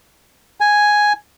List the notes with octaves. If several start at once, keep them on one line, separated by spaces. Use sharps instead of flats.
G#5